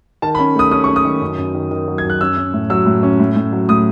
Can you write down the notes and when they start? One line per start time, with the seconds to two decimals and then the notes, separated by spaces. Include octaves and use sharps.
0.22 D#3 A5
0.35 B5
0.39 C#4
0.55 A3 D#6
0.71 C#4 D#6
0.84 C#4 C#6
0.96 D#6
1.05 D#3
1.21 F#2
1.38 F#2
1.54 D#3
1.71 D#3
1.88 F#3
1.98 G#6
2.04 F#2
2.10 F#6
2.21 C#4 E6
2.37 C#4
2.53 A2
2.70 F#3 E6
2.86 A2
3.03 C#4
3.19 A2
3.36 A2
3.52 F#3
3.69 A2 D#6